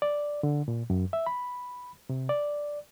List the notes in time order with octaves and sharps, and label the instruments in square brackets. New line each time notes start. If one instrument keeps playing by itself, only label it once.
[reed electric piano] D5
D3
A#2
F#2
E5
B5
C3
D5